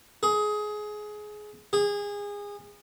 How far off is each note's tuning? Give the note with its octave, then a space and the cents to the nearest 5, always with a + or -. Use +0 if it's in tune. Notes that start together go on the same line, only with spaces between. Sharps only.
G#4 +20
G#4 -25